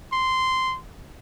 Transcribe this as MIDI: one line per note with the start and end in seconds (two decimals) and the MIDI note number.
0.13 0.78 84